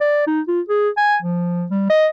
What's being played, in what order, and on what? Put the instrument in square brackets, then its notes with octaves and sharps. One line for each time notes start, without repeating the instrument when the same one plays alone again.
[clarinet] D5
D#4
F4
G#4
G#5
F3
G3
D#5